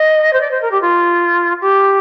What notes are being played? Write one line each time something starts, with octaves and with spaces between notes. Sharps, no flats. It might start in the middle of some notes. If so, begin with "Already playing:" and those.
Already playing: D#5
C5
D5
C5
A#4
G4
F4
G4